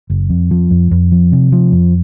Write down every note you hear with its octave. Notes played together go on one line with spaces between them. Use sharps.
F#1
F2
F3
F2
F2
F3
C3
F3
F2